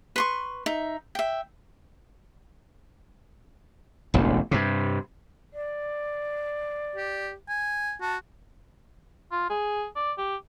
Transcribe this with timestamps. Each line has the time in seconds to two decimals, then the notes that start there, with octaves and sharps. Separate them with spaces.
0.16 B4 C6 C#6
0.66 D#4 E5
1.15 E5 G5
4.14 E1 A1 D2
4.51 G2 C3
5.54 D5
6.96 G4
7.48 G#5
8.01 F#4 A5
9.32 F4
9.50 G#4
9.96 D5
10.18 G4